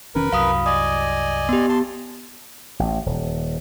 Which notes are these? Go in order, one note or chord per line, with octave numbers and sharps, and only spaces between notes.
E1 D#3 C#4 A#4 B4
C2 F#2 F#3 F5 B5 D#6
D5 D#5 G#5 D#6
B3 G4
A5 C6
A1
D#1